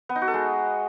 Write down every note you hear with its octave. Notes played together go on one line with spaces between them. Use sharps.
B3
D#4
F#4
A4
G#3